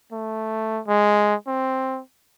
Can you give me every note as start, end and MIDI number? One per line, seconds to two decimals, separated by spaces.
0.12 0.81 57
0.87 1.35 56
1.47 2.01 60